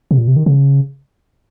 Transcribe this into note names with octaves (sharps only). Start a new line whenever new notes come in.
C3
A#2
C3
D#3
C#3